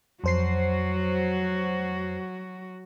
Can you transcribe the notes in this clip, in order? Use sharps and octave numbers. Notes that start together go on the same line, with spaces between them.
F2 F#3 F#4 C5 C7